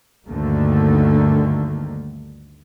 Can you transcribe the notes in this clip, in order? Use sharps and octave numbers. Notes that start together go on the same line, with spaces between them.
D2 G2 D3 D#3 A3 A#3